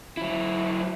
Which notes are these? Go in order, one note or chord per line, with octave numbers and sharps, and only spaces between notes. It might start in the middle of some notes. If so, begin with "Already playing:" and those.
F#3 E4